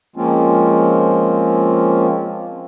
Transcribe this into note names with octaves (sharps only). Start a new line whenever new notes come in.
F3 G#3 A#3 C4 C#4 F4